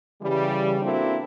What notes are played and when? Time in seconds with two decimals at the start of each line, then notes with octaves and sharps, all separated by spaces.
0.21 C#3 E3 G3
0.82 A#3 C4 D4 E4 F#4 A4